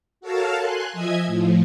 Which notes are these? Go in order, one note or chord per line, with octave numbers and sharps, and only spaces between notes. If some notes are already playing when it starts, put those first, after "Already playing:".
F#4 A4 A#4 C#5 F5 A5
G#5 C6 F#6
F3 D#5 E5 G#5 G#6
A2 F3